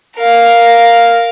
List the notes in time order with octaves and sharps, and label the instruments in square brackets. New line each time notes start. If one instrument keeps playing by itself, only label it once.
[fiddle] A#4 F5